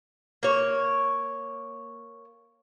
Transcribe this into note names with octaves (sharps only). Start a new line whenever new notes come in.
A#3 C#5